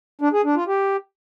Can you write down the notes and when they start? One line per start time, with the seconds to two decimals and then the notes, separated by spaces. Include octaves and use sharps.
0.21 D4
0.33 G#4
0.44 D4
0.56 F4
0.67 G4